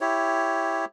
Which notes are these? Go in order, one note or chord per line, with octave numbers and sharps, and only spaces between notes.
E4 G4 C#5